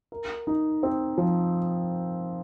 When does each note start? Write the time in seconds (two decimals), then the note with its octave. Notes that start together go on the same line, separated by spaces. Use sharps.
0.12 A#4
0.47 D#4
0.83 C4
1.18 F3